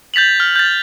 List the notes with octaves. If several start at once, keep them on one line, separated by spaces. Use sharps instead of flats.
G6 A6 B6 F7 F#7
F6
G6 A6